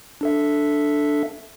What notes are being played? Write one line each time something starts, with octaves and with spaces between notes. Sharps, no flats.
D4 A4 E5